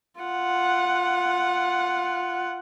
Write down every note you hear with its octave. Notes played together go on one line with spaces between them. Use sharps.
F4 F#5